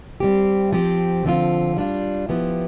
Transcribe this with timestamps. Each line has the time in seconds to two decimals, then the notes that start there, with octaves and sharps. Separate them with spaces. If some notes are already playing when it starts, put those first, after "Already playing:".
0.20 G3 C4 G4
0.73 F3 C4 G4
1.25 D3 F3 C4 F4
1.76 G3 D4 F4
2.29 F3 B3 E4 G4